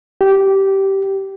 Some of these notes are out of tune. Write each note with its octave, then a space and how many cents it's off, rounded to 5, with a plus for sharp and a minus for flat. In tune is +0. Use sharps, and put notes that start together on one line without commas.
G4 -15